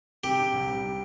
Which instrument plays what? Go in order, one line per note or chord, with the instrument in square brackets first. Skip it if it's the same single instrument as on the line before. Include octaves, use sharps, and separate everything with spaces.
[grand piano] C3 [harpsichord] G4
[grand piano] D4
C2
G3
C3